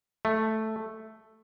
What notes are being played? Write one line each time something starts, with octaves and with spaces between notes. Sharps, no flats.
A3